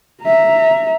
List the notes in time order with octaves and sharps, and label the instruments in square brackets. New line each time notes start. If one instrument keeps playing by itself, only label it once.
[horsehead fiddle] E5 A#5